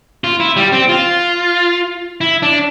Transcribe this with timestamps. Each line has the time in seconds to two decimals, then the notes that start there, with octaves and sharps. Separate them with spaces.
0.24 F4
0.40 E4
0.56 G3
0.72 C4
0.89 F4
2.21 E4
2.42 D4